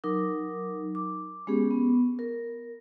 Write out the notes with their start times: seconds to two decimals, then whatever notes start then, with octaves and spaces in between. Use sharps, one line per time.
0.04 F#3 D#4 A#4 D6
0.95 D6
1.47 G#3 B3 C#4 G4 G#4
1.71 B3
2.19 A#4